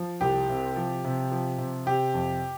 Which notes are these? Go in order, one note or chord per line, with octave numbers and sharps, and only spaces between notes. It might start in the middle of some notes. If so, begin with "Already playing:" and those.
Already playing: F3
C2 G4
C3
F3
C3
F3
C3
C3 G4
F2